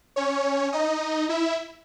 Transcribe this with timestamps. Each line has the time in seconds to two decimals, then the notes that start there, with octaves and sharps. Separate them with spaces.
0.16 C#4 C#5
0.73 D#4 D#5
1.29 E4 E5